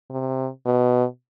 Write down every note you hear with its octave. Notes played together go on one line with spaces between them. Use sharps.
C3
B2